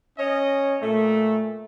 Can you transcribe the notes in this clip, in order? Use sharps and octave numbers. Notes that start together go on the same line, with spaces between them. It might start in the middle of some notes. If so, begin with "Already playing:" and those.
C#4 C#5 D#5
A#2 A3